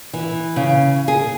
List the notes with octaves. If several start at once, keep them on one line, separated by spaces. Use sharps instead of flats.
E3
C#3
G#4